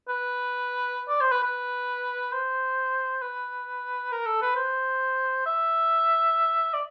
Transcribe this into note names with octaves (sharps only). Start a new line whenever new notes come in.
B4
D5
C5
B4
B4
C5
B4
A#4
A4
B4
C5
E5
D5